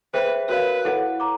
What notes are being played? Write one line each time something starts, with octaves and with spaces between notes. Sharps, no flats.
G#4 B4 C5 E5 G5
F#4 A#4 B4 C#5 F5
E4 A4 C#5 F#5
A#5 D6